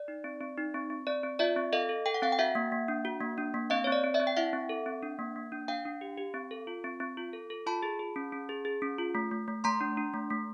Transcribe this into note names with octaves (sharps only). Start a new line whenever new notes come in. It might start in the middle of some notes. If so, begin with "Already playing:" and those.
Already playing: D5
D#4
C4
C4
D#4
C4
C4
C4 D5
C4
F4 D5 E5
C4
A4 D#5 F5
A4
A4 G5
F#5
C4 F5 G5
G5
F#4 E5 F#5
A#3
A#3
D4
F#4
A#3
D4
A#3
C4 D#5 F5
C4 C#5
D5
C4
D5 E5
C4
G5
E4 E5 F#5
C4
A4
C4
D4
A#3
A#3
D4
D4 F5 G5
D4
G4
G4
C4
A4
F4
C4
C4
F4
A4
A4
F4 A5 B5
G#4
G#4
C#4
C#4
G#4
G#4
C#4
F4
A3
A3
A3
A3 A#5 C6
D4
D4
A3
A3